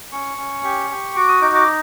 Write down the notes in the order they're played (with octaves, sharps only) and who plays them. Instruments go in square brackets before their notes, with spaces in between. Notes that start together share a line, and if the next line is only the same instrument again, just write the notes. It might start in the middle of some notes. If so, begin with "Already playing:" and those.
[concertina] C#4 C#6
C#4
G4
G4
F#4 D6
D#6
D#4 D6
D6